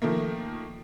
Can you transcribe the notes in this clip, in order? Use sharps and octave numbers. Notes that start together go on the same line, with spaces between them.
D#3 F3 A3 A#3